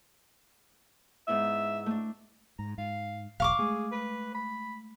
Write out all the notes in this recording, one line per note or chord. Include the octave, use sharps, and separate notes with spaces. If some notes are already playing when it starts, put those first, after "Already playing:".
G#2 B3 E4 E5
A3 D4
G#2 A#5
G#2 F5
E1 B1 F5 C#6 D6
G#3 A3 G#4
B4
B5